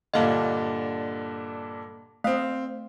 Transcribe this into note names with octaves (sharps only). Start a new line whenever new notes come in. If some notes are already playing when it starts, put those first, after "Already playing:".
G2 A#2 D3 D#5 F5
A3 C4 F5